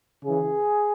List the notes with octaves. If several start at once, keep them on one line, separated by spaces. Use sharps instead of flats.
C#3 E3 G#4